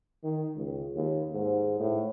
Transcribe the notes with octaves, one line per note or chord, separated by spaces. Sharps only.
D#3
C#2
D#2
G#2
A2